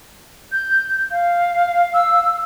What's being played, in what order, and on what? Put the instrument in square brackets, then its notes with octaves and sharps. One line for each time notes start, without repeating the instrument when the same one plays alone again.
[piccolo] G6
F5
[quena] E6